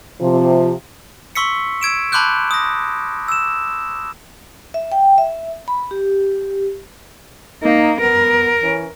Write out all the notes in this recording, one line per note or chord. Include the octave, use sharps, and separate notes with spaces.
C3 F3
C6 C#6 E6 B6 C#7
E6 G#6 D7 E7
A5 B5 C6 D6 F#6 G6
D#6 A#6
E6 E7
E5
G5
E5
B5
G4
A#3 D#4
B3 A#4
E3 C#4